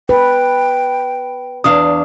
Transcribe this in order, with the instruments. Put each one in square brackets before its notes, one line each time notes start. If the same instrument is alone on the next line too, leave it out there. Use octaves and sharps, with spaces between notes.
[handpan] B4 [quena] G5
[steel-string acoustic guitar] E2 D4 F5 [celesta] D#6